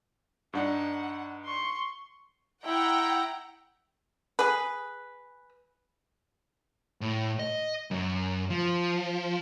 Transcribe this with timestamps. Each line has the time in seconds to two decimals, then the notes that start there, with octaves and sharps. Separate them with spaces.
0.53 G2 D4 D#4 F#5
1.45 C6 C#6
2.64 E4 F#5 G5 A#5
4.39 G#4 B4
7.01 A2
7.39 D#5
7.91 F#2
8.50 F3